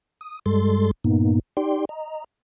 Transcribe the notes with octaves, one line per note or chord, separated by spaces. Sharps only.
D#6
G2 G3 G#3 A4 C6 A6
G2 A#2 A#3 B3 D#4
D#4 G4 D5 G5 C6
D#5 A#5